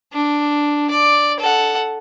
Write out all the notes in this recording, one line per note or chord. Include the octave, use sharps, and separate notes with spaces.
D4
D5
A4 F#5